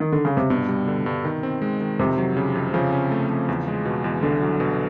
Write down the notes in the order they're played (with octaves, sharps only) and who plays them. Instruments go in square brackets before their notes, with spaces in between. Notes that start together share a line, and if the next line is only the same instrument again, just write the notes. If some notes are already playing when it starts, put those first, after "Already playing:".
[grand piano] D#3
D3
C#3
C3
[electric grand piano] G2 [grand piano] B2
[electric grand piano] G3
D3
G2
D#3
C4
G#3
D#3
[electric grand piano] F2 [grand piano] C3
[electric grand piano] F#3
C#3
F2
[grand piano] C#3 [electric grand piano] F3
[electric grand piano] C#4
A3
F3
E2
G#3
B2
E2
[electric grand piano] C2 [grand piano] D3
[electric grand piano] F#3
B2